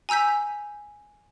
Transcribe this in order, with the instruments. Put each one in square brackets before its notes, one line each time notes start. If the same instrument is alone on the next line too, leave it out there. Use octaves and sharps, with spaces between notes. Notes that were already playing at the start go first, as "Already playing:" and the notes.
[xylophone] G#5 A#5 E6 G6 B6